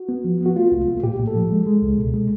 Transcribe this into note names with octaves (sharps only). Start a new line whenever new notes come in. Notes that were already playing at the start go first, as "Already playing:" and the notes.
Already playing: F#4
B3
F3
B3 F#4
A3 F4
C2
A3
A#2 G4
A#2
A4
F3
G#3
G#3
C#2
B2
G#3